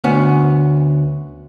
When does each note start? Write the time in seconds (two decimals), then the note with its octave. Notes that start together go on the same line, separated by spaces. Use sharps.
0.04 D2 B3 C#4